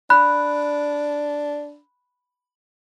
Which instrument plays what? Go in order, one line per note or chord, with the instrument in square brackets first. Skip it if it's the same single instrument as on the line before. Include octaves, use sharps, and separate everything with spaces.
[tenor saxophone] D4 [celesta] B5 F#6